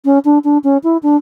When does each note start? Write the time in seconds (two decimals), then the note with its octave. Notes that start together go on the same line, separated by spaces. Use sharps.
0.05 C#4
0.25 D4
0.44 D4
0.64 C#4
0.83 E4
1.03 D4